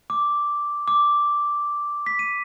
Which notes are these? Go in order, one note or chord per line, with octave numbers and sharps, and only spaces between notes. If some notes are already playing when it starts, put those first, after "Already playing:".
D6
D6
B6
D#7